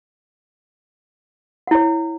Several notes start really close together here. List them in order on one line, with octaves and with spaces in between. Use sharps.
F#5 E4 C#5